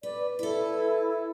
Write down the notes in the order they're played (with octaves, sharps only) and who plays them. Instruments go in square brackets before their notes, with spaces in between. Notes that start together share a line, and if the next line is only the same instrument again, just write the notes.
[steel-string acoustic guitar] B4 [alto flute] D5
[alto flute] E4 [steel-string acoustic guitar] A4 B4